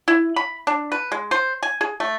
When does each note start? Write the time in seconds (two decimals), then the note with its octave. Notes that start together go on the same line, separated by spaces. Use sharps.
0.08 E4
0.36 B5
0.67 D4
0.92 B4
1.12 G#3
1.31 C5
1.63 G#5
1.81 G#4
2.00 A3